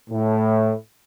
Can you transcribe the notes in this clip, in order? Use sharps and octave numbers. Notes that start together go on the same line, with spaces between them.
A2